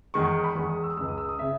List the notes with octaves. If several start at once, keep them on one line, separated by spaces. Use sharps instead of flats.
E2 D#3 G#3 C#6
B5
E2 D#3 G#3 C#6
D#6
E6
C#2 C#3 G#3 E6
D#6
E6
D#6
C#3 E5